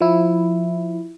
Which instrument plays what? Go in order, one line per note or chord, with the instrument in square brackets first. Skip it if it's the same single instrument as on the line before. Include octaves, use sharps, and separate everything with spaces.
[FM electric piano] F3 E4